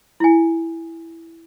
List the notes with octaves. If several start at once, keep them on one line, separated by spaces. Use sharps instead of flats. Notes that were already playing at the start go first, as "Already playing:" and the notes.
E4 G#5